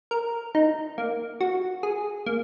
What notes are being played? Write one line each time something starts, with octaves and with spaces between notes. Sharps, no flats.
A#4
D#4
A#3
F#4
G#4
A#3